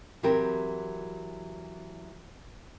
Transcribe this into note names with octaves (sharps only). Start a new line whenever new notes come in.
E3 F#3 C4 G4 A#4